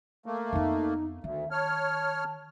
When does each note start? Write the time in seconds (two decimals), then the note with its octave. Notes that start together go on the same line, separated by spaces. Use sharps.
0.26 A3 A#3
0.53 F2 B3 D#4
1.24 D2 D#3 E5
1.51 C#5 A5 F6